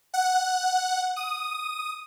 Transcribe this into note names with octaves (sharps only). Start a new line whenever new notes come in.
F#5
D#6